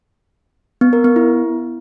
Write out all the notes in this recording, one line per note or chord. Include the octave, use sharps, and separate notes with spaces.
B3
A#4
B3
E4